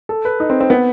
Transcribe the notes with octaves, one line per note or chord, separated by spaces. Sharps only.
A4
B4
D#4
C4
C4
B3